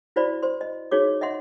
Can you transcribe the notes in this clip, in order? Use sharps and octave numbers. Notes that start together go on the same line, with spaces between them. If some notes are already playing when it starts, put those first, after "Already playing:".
E4 F#4 C5 D5 B5
C5 C6
D#5
D#4 F#4 G#4 C#5 D6
D#5 E5 F#5 C6